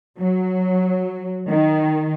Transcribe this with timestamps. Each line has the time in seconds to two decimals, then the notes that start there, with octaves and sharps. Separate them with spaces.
0.19 F#3
1.49 D#3